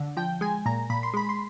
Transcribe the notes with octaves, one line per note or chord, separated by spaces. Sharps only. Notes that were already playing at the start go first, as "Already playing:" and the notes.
Already playing: D3
F3 G5
G#3 G#5
A#2 A#5
A#2 B5
C6
G#3 B5
C6